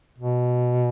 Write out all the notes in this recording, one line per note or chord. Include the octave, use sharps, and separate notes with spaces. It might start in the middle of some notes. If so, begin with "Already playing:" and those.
B2